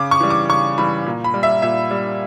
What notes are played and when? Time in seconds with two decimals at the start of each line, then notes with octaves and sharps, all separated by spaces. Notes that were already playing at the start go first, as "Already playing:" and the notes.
Already playing: C#3 D6
0.11 C#6
0.20 E3 G3
0.30 D6
0.49 C#3 C#6
0.78 E3 G3 B5
1.06 A#2
1.24 B5
1.34 G3
1.43 E5
1.62 A#2 E5
1.91 G3